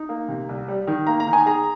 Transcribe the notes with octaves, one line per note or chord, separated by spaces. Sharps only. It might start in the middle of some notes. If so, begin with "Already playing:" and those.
Already playing: D#4
A#3
C3
C2
G3
D#3
A#3 A#5
A#5
D#3
G#5
G#4 A#5